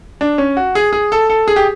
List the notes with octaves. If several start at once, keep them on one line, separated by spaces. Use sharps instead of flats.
D4
C#4
F#4
G#4
G#4
A4
A4
G#4
G4